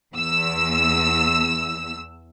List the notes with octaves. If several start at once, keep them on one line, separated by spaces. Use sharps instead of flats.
E2 E6